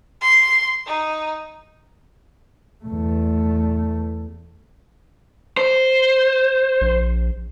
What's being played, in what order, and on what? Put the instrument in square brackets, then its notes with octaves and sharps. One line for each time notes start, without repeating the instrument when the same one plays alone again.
[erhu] C6
D#4
[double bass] E2 A3
[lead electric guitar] C5
[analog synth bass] A#1